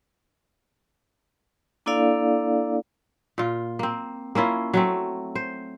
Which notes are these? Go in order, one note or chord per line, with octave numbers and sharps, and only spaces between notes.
A#3 D4 E4 A4 D5 F5
A#2 F4
A#3 C4
A#3 C#4 E4 F4
F#3 A3 C4
C5